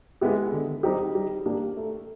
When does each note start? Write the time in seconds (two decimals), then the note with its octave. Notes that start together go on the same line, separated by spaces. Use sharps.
0.21 G#3 B3 E4 G4
0.52 D3
0.83 G3 C4 D#4 G4
1.15 G3
1.46 A#3 D4 G4
1.77 A3